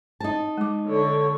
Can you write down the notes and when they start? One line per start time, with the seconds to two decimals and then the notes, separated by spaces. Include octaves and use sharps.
0.20 D#4 A5
0.58 G#3 D6
0.88 D3 C#5